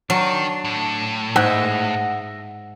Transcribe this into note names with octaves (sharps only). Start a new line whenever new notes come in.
D#3 F#3 D4
A2
G#2 D#5 E5 F#5